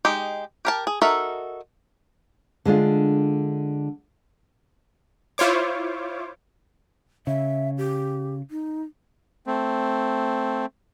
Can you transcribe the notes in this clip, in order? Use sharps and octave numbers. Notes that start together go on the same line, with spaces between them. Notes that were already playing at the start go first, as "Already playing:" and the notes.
G#3 D#4 G4
G4 A#4 A5
G#4
D#4 F#4 A4 A#4 E5
D3 G#3 D4 F4
E4 F4 C5 C#5 D6
C#3 E5
G4
D#4
A3 C4